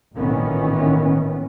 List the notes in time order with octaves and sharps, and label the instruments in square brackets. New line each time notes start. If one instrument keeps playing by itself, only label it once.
[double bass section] A1 A#2 D#3 E3 B3 C#4